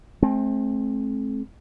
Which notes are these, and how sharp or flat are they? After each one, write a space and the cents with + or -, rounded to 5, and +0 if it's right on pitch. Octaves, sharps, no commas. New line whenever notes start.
A3 -40 C4 +25